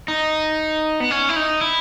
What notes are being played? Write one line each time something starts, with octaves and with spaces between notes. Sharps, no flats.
D#4
B3
C#4
E4
D#4
E4